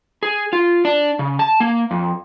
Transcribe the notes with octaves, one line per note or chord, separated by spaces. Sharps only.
G#4
F4
D4
C#3
A5
A#3
F2